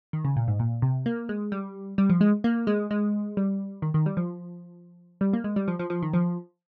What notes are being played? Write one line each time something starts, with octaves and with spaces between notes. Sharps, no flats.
D#3
C#3
A#2
G#2
A#2
C3
A#3
G#3
G3
G3
F3
G#3
A#3
G#3
G#3
G3
D#3
D#3
G3
F3
G3
A#3
G#3
G3
F3
F3
F3
D#3
F3